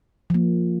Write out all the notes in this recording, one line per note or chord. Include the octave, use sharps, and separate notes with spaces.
F3 A#3